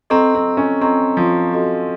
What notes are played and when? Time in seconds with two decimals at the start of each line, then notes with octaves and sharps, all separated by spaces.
0.10 C4 A4 D#5 A#5 C#6
0.35 C4
0.57 C#4
0.81 C4 A4 D#5 A#5 C#6
1.17 F3
1.53 F#4 A4 D#5